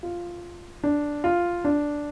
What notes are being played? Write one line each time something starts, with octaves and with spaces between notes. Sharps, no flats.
F4
D4
F4
D4